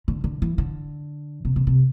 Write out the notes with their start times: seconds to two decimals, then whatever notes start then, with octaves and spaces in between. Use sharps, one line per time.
0.08 D3
0.24 D3
0.42 E3
0.58 D3
1.45 C3
1.56 C3
1.67 C3